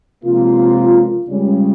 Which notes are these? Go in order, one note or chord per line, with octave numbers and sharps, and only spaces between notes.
C#2 C3 F3 A#3 F4
C#2 C#3 G3 C#4